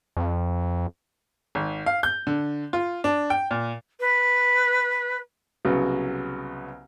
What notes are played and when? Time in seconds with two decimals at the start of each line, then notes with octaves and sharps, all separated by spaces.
0.17 F2
1.55 G#1
1.86 F5
2.03 G6
2.27 D3
2.73 F4
3.04 D4
3.30 G5
3.51 A#2
4.00 B4
5.65 C2 C#3 F#3 B3